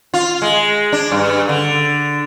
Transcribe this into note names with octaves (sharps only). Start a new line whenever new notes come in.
F4
G#3
D4
G2
D3